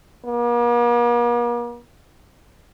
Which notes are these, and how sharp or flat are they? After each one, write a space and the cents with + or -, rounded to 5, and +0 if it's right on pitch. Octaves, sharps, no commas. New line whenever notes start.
A#3 +45